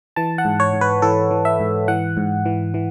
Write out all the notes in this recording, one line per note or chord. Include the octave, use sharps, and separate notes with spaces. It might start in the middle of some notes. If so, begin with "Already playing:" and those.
E3 A5
F#5
G#2
C#5
G#2
B4
E3 A4
E3
E5
G#2
E3 F#5
G#2
E3
E3